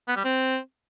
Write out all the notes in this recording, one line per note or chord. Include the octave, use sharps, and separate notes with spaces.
B3
G3
C4